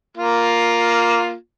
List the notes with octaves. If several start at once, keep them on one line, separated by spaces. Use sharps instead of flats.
A#3 F4